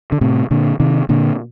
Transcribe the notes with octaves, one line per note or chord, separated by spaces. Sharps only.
D3
A2 C3
A#2 D3
C3 D#3
A#2 D3